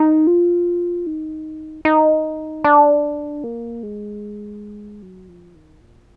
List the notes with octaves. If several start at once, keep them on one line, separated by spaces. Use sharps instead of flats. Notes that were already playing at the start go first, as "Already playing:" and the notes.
Already playing: D#4
F4
D#4
D#4
D4
A#3
G#3
F#3
F3
D#3
A#2